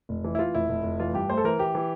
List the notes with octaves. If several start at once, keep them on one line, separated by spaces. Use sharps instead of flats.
F1
E3
E4
E3 F4
F1 E4
F1
F1
E3 F4
G2 G4
A3 C5
A4
E3 A#4
E3 G4
E3